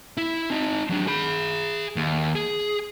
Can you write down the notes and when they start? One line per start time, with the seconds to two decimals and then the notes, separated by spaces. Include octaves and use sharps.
0.17 E4
0.50 C4 D#4
0.90 F#3 D4
1.07 G#4 B5
1.96 D#2
2.35 G#4